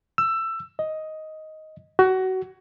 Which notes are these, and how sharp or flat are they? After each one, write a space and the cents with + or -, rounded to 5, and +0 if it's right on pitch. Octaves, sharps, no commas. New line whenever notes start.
E6 +20
D#5 +10
F#4 +20